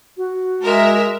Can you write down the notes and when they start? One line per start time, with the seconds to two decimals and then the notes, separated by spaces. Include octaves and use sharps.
0.17 F#4
0.63 G#3 A#4 E5